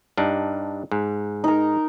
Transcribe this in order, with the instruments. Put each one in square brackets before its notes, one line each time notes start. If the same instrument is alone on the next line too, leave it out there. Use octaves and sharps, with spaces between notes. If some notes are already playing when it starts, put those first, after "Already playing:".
[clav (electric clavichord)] G2 D4 D#4
G#2
[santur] D#4 A#4